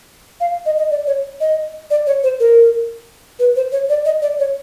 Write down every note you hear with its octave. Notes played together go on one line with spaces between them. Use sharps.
F5
D#5
D#5
D5
C#5
D#5
D5
C#5
C5
A#4
B4
C5
C#5
D5
D#5
D5
C#5